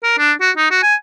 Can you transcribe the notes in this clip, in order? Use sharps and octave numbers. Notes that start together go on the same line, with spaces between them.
A#4
D4
F#4
D#4
F#4
G#5